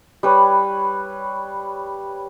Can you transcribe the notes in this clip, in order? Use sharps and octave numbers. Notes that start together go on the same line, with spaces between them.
G3 B4 C#5